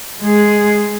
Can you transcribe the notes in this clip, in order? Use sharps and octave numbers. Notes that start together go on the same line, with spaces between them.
G#3 G#4